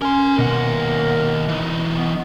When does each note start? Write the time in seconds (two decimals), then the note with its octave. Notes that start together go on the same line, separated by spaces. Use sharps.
0.02 C#4 A#4 C6
0.38 D#2 B2 A#4 F#5
1.49 E3 D#4
1.98 B3